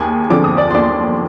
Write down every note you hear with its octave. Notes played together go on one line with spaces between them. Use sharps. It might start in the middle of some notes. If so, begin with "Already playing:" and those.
Already playing: D#2 G#4 G#5
D3 F3 C4 D6
D#6
D5 D6
C6
D#2 D5 D6